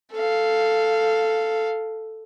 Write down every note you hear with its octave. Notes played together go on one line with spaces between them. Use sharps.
A4 F5